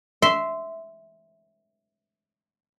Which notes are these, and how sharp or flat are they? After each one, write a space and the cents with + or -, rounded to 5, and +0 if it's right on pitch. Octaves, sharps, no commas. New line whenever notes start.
E5 -5 C6 -15